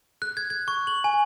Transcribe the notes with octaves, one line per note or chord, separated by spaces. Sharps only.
F#6
G#6
G#6
C#6
F#7
G#5